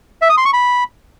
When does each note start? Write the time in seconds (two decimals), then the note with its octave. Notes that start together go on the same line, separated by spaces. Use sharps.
0.22 E5
0.30 D#6
0.38 C6
0.45 C#6
0.53 B5